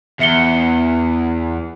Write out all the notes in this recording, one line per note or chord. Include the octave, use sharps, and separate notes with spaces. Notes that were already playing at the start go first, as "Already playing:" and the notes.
E2 E5 C#7 G7